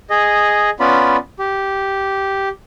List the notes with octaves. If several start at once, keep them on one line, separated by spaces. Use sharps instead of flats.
G#4 D#5
B3 C#4 F4 D5 B5
G4